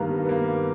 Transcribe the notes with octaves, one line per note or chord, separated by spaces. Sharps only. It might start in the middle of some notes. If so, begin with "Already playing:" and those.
Already playing: G2 D#3 A#3 B3
B3
A#3